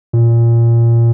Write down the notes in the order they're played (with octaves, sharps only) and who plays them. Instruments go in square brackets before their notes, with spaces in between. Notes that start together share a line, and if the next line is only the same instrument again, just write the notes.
[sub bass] A#2